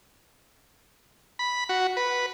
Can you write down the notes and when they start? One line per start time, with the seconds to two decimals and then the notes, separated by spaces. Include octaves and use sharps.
1.39 B5
1.69 F#4
1.97 B4